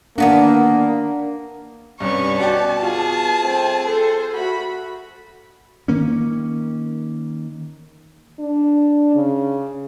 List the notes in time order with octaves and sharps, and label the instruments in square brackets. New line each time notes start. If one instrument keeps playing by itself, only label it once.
[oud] D#3 B3 F#4 [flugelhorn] A#3 [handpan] D4
[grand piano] C2 G2 [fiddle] C#4 B4 [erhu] C#6
[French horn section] B2 [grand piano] F#4 D5 G5 [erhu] A5
[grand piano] F4 [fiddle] G#4
[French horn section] G3 A3 C4
[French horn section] A4 [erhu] C5
[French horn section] A3 F#4 [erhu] B5
[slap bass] D#3 A#3 C#4
[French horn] D4
C#3